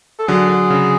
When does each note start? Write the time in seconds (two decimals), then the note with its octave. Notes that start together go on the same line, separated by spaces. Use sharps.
0.19 A4
0.28 D3 F#3 G#4
0.49 D3
0.70 C#3